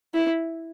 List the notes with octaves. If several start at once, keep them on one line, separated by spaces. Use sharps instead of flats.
E4